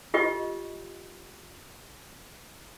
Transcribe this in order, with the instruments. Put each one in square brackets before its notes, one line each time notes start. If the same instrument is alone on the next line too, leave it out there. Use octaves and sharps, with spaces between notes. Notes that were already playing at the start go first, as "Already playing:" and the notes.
[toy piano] F4 G4 D#5 C#6